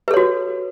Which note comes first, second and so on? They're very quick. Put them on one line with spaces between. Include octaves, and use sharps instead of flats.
B4 A4 C#5 F#4